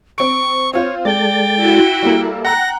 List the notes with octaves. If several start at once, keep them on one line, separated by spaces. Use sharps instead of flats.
C4 C#6 D7
C4 F4 C5 C#5
G#3 A4 D5 G5 A6
E4 F#4
G3 A#3 A4 E5
F#5 G5 A#5 F#6 A#6